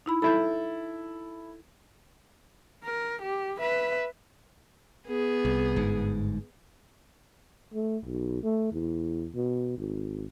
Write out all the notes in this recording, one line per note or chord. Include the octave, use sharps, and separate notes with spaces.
D#4 E4 B5
E4 A4 B5 G6
A#4
G4
B4 E5
B3 G#4
C2
G1 G#2
A3
B1
A3
E2
B2
G#1